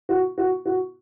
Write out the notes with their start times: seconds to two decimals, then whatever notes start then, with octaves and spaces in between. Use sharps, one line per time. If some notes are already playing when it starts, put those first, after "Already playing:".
0.09 F#4
0.38 F#4
0.65 F#4